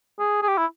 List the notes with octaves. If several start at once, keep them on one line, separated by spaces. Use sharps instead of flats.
G#4
G#4
G4
E4